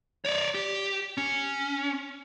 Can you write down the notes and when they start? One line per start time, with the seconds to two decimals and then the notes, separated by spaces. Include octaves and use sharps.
0.25 C#5 D5
0.55 G4
1.17 C#4